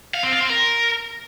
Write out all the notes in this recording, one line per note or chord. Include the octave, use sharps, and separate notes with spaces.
F5
C4
F4
C4
A#4